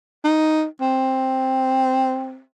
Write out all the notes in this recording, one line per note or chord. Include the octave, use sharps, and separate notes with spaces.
D#4
C4